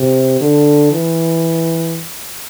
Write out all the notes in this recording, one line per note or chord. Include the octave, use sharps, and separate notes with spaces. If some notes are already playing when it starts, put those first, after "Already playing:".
Already playing: C3
D3
E3